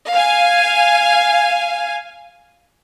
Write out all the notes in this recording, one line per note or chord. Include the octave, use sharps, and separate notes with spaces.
F5 G#5